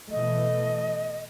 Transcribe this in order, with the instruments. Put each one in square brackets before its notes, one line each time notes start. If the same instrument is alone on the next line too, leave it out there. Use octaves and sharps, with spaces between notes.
[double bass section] B2 E3 A3 [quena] D#5